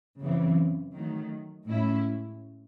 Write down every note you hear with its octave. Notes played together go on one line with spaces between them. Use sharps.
F#2 C#3 E3 C4
D#3 F#3 A3
A2 G#3 C#4 E4